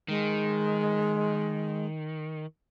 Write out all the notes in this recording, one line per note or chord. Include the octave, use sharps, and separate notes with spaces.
D#3 G#3